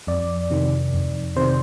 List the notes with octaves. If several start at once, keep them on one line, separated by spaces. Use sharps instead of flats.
F2 D5
C3 D#3
F2
C3 D#3 C5